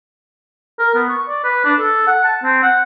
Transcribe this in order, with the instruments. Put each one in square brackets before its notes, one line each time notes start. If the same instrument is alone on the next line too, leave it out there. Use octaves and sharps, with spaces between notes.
[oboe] A#4
B3
C#6
D5
B4
D4
A4
F#5
A5
C4
F#5